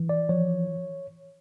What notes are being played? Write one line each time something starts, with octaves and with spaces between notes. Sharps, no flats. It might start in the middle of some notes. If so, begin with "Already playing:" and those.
Already playing: E3
D5
F3 C#5